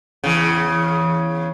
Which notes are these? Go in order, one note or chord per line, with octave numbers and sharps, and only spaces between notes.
E2 C#3